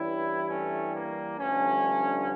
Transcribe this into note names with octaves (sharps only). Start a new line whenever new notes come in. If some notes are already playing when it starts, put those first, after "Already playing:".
Already playing: G2 E3 G3 C#4 E4
A3 C#4
A#3
G2 D3 F3 A3 C#4